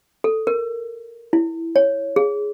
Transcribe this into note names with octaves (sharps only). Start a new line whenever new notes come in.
A4
A#4
E4
C#5
G#4